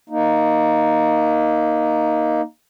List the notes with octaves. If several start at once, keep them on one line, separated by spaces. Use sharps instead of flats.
A#3 D#4